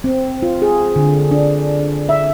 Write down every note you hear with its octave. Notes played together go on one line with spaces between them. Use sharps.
C4
F4
G#4
D3
D4
E5